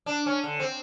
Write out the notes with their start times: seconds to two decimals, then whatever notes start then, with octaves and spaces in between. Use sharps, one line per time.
0.06 D4
0.26 C#4
0.44 D3
0.60 C4